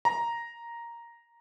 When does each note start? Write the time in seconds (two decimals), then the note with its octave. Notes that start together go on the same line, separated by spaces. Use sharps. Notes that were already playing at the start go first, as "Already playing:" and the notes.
0.05 A#5